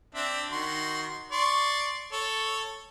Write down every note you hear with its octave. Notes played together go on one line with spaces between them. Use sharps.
C4 D4 E5
D#3 F#4 C6
D5 C6 C#6
A4 C#5